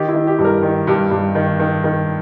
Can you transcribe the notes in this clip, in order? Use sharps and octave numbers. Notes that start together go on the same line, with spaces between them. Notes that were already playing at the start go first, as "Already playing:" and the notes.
Already playing: D#3 G4
E4
D#3
G4
G2
A#4
D#3
G2
G2
D#3
D#3
D#3